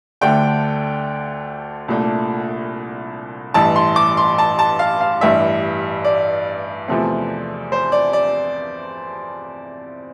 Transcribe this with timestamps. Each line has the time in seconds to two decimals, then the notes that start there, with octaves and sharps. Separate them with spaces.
0.21 D2 D3 A3 D4 G5
1.88 C2 A#2 A3 D4
3.54 A1 G2 E3 A5
3.76 C6
3.96 D6
4.17 C6
4.38 A5
4.59 A5
4.79 F5
5.01 F5
5.21 A1 G2 E3 G3 E5
6.05 D5
6.88 E2 C3 F3 A3 C4
7.72 C5
7.92 D5
8.13 D5